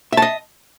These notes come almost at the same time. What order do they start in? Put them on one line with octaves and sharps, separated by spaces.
E5 A5 D#5